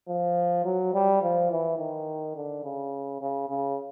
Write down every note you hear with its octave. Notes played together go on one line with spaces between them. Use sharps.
F3
F#3
G3
F3
E3
D#3
D3
C#3
C#3
C#3